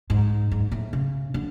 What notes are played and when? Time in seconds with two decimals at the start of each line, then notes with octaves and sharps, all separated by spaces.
0.10 G#2
0.51 G#2
0.72 A2
0.93 C#3
1.34 D3